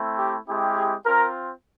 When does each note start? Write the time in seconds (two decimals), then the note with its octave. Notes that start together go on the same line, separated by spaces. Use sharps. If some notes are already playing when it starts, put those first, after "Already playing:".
Already playing: A3 C4 E4
0.18 G4
0.47 G#3 C4 E4 G4
0.77 G#4
1.06 C4 F4 A#4